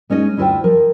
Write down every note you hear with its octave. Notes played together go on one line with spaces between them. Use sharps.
G#3 C#4 D#4 D#5
D2 E4 F4 C5 G5
F3 A#4